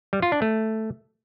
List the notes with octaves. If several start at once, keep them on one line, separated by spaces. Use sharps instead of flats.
G3
F4
D4
A3